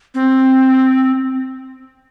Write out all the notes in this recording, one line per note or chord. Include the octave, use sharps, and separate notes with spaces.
C4